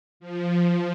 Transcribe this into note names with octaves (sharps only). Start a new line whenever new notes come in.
F3